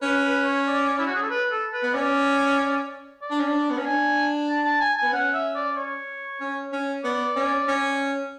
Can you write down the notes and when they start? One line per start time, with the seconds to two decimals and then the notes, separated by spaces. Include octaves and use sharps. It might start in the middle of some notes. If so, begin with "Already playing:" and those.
0.02 C#4 B4
0.24 B4
0.44 C#5
0.67 D5
0.98 E4
1.07 F#4
1.15 G#4
1.22 A4
1.30 B4
1.51 A4
1.73 B4
1.83 B3
1.93 C#4 D5
3.22 D5
3.30 D4
3.40 C#4
3.48 D4
3.70 B3
3.78 C#4
3.86 D4 G#5
4.49 A5
4.65 A5
4.80 G#5
4.97 G#5
5.02 B3
5.12 C#4 F#5
5.33 E5
5.55 D5
5.76 C#5
6.40 C#4
6.73 C#4
7.04 B3 D5
7.36 C#4
7.68 C#4